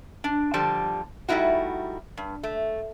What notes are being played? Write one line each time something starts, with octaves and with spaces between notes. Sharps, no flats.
D4
D3 F3 G3 A5
G3 A3 D#4 E4 F#4
G2
A3